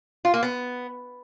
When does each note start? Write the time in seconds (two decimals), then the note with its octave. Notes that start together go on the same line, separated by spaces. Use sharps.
0.25 F4
0.34 A#3
0.43 B3